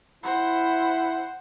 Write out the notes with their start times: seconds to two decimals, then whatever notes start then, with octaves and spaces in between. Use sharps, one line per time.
0.24 E4 C5 F#5